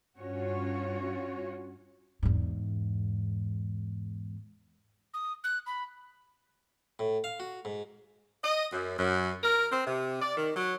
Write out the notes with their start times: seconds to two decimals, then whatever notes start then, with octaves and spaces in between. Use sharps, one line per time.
0.19 G2 C#4 F4 F#4 C#5
2.23 E2 G#2
5.14 D#6
5.44 F#6
5.66 B5
6.99 A2
7.24 F5
7.40 F#4
7.65 G#2
8.43 D#5
8.73 F#2
8.98 F#2
9.43 A#4
9.72 C4
9.86 C3
10.22 D5
10.37 D#3
10.55 F#3